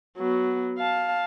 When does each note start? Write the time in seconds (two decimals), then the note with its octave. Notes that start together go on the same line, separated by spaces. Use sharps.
0.18 F#3 B3
0.79 F5 A5